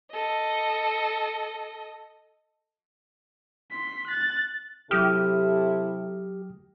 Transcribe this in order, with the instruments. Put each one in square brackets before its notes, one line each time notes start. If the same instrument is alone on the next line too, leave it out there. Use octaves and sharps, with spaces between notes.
[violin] A4 D#5
[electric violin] C6 B6
F#6 A6
[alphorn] C3 [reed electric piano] F#3 D#6 F6 [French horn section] E4 A4 [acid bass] G4